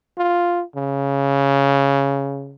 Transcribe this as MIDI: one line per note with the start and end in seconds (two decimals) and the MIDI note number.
0.18 0.63 65
0.76 2.55 49